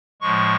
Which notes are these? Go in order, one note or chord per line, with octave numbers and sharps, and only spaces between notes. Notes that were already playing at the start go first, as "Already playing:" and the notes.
A2 F3 G#3 C#6